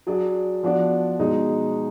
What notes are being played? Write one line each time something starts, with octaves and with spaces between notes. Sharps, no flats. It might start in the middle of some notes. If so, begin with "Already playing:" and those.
F#3 D4 G#4 D5
F3 B3 D4 F#4 D5
B2 G#3 D#4 G#4